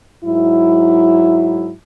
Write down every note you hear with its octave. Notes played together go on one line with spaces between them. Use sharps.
G#2 F#3 E4